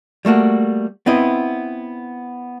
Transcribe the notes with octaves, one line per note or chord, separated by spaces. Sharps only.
G3 A3 A#3 F#4
B3 C4 E4 D#5